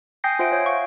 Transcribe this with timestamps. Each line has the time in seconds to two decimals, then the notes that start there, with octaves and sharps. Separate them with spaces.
0.24 G5 G#5 D#6 G6 A#6 C7
0.39 F4 C5 E5 F#5 D7
0.52 C#5
0.65 F5 C#6